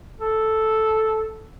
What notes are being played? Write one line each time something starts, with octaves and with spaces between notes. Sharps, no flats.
A4